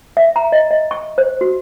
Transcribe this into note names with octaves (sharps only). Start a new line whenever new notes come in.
E5
A#5
D#5
D#5
C#6
C5
F#4